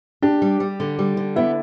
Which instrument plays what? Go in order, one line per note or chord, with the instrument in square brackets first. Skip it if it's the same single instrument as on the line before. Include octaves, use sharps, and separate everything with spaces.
[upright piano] D4 [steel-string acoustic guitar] G4
[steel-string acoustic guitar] G3
G3
D3
G3
D3
[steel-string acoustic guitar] B3 [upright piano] E4